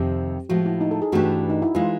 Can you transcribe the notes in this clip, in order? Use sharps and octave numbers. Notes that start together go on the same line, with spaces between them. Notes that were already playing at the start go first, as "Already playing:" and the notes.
Already playing: F2 C3 D#3 G4
A2 F3 G#3 F#4
E4
D#4
A4
G#4
G2 E3 A3 D4 F#4 G4
D#4
E4
E3 G#3 F4